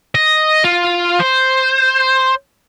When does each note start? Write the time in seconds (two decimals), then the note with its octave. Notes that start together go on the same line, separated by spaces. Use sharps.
0.15 D#5
0.64 F4
1.19 C5